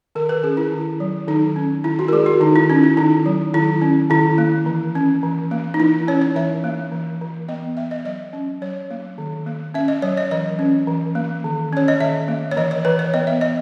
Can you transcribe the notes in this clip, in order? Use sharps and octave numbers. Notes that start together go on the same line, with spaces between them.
D#3 A#4
B4
C#4 G#4
E4
D#3
F#3
D#3 D#4
C#4
D#3 E4
F#4
A#4
G#3 G#4
F#4
D#3 D#4
E4
C#4 D#4
E4
D#3 D#4
F#3
D#3 E4
C#4
D#3 E4
A#3
E3
C#4
E3
A#3
D#4
E3 E4
C#4 C#5
C#5
E3 E5
A#3
E3
E3
B3 D#5
B3 E5
D#5
F#3 D#5
C#4
F#3 C#5
A#3
D#3
A#3
C#4 E5
D#5
F#3 C#5
D#5
E3 D#5
C#4
E3
A#3
D#3
C#4 C#5
D#5
D#3 E5
A#3
C#5
E3 D#5
C#5
E3 B4
C#5
B3 D#5
E5
B3 D#5